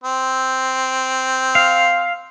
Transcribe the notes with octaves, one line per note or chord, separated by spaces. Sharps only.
C4
F5